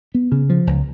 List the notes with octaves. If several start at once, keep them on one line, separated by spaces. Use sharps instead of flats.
B3
C#3
F3
C#2